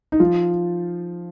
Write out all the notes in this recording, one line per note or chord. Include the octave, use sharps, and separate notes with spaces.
D#4
F3 F4